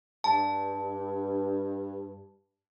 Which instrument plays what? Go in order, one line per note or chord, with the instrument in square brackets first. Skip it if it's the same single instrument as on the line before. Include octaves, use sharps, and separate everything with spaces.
[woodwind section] G2 [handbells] A5